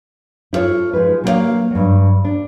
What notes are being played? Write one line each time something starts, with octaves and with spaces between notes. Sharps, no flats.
E4 F4 A4 C#5
F3 G#3 D#4 B4
F#3 A#3 D4 E4 C#5 F5
G2 F#3
D4